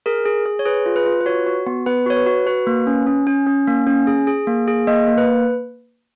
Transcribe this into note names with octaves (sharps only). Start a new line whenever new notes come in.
G#4 A#4
G#4
G#4
C#5
G#4 B4
F4
B4
F4
B4
F#4 C#5
F#4
B3
B3 B4
F#4 C#5
B4
F#4
F#4 B4
A#3
C#4
C#4
C#4
C#4
A#3
C#4
G#4
G#4
A#3
G#4
A#3 D#5
A#3
B4